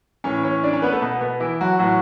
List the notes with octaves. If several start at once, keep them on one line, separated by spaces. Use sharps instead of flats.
A2 E3 C#4 C#5
C#4 C#5
D4 D5
C#4 C#5
B3 B4
A3 A4
B2 B3
B2 B3
E3 E4
F#3 F#4
A2 E3 F#3 F#4